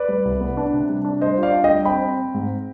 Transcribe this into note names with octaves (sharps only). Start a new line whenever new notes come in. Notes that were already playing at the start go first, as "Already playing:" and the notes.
Already playing: B4 D5
G3
C2
B3
D4
C3
G3
D4
G3 C5 D#5
F4
D5 F5
D4
D#5 G5
G3
C4 G5 B5
C4
C4
G#2